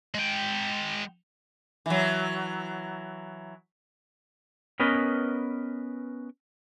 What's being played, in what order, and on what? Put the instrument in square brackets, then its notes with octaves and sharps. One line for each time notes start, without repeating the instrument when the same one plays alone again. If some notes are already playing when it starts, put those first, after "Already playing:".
[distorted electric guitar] G#3 G5
[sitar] E3 F#3
[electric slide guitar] B3 C#4 A#4 B4 D#5